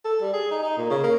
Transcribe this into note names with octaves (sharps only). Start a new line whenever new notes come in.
A4
G3
G#4
D#4
D#4
A#2
C#3
A#3